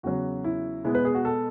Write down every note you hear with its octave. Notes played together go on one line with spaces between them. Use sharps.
E2 C#3 F#3 F#4
E4
B2 G#3 B3 E4
B4
G#4
F#4
A4